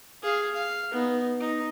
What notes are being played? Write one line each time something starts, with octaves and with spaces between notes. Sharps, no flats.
G#4 F5
F5
B3 D#4
D#4